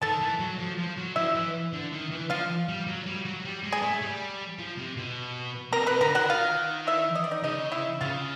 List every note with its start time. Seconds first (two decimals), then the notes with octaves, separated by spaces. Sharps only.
0.02 D#3 A4 A5
0.21 E3
0.40 F#3
0.59 F3
0.78 F3
0.97 F#3
1.16 F3 E4 E5
1.35 E3
1.73 D3
1.92 D#3
2.11 E3
2.30 F3 F4 F5
2.68 G3
2.87 F#3
3.06 G3
3.25 F#3
3.45 G3
3.63 G#3
3.72 G#4 G#5
3.82 A3
4.02 G3
4.58 F3
4.78 C3
4.97 B2
5.72 C3 A#4 A#5
5.87 C3 B4 B5
6.01 D3 A#4 A#5
6.15 D#3 F#4 F#5
6.30 F4 F5
6.87 E4 E5
7.15 D#5
7.24 D5
7.31 D#4 D#5
7.44 C#3 D#4 D#5
7.72 E4 E5
8.01 C#3 F4 F5